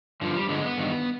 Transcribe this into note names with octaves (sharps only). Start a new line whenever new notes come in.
G2 D3 F3
G3
G2 D3 G#3
B3
G2 D#3